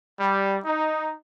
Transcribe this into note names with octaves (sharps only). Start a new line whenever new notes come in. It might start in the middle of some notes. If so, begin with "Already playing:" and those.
G3
D#4